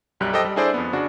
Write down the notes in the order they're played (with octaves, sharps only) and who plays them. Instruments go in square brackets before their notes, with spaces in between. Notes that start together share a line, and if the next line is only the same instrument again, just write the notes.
[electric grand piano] B1 F#2 G3 G4 F#6
G4 A4 C5 D#5 G5
G3
D4 E4 G#4 A4 C5 D5
F2 B3
C#3 D4 F#4